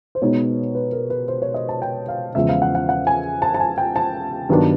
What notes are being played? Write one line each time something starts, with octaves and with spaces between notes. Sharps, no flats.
C5
B2 G#3 B3 D#4 C#5
B4
A#4
B4
C5
C#5
D#5
A5
G5
F5
E2 C#3 F3 G#3 E5
F5
F#5
F#5
F#5
G#5
A5
A5
G#5
G5
A5
G2 D#3 F#3 B3 D4